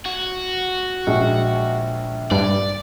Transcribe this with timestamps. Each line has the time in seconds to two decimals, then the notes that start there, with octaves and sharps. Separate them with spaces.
0.06 F#4
1.07 A#1 G#3
2.31 G2 D5